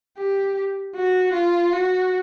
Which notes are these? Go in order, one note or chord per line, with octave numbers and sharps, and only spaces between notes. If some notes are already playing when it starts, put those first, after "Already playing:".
G4
F#4
F4
F#4